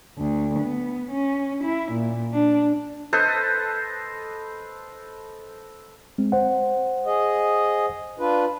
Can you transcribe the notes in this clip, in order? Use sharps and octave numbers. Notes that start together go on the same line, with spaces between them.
D2
B3
C#4
E4
A#2
D4
A4 B4 C5 D#5
G#3 C4
C5 F#5
G#4 D#5
D4 F4 B4